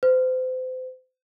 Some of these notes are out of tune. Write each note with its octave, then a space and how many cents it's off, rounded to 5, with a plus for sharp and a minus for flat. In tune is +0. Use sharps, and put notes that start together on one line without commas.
C5 -35